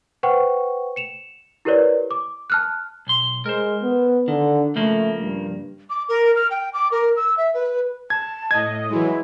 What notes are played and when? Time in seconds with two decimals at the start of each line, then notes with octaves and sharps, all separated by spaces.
0.23 B4 C5 F#5 G5 C#6
0.96 C#7 E7 F7
1.65 E4 G4 A#4 B4 C#5 D5
2.11 D6
2.50 A5 F6 F#6
3.07 B1 C6
3.46 G#3 A#4 C5
3.82 B3
4.28 D3 D#3
4.76 C#3 F3 A3 A#3
5.21 G2
5.90 D6
6.09 A#4
6.35 F6
6.51 G5
6.73 D6
6.92 A#4
7.16 E6
7.38 E5
7.54 B4
8.10 A5 G#6
8.51 A2 D#5 G#6
8.89 E3 F#3 G#3 E4